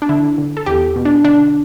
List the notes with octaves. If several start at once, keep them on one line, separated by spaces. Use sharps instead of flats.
D4
D3 E4
D3
A4
E2 G4
B2
D4
D3 D4